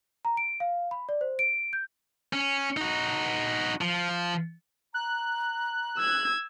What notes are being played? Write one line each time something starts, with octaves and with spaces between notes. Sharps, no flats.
A#5
D7
F5
B5
D5
C5
D7
G6
C#4
D#4 F#4
F3
A#5 F#6
E6 G#6